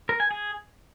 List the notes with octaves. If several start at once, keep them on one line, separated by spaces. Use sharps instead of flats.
A#4
G#5
G#4